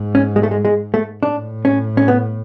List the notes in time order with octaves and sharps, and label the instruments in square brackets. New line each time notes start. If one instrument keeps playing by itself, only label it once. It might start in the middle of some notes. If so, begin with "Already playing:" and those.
Already playing: [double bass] G#2
[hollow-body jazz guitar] C#4
G#3
A3
G#3
G#3
A3
[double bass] A2 [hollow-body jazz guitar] D4
[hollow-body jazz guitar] C#4
C#4
B3